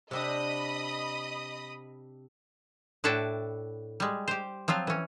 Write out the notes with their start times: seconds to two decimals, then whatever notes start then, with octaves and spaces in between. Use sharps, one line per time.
0.11 C3 C4 D4 D#5 B5 D#6
3.04 A2 D4 E4 F#4 G5 A5
4.00 G3 G#3
4.28 G4 C5
4.68 F3 F#3 C4 F4
4.87 E3 C#4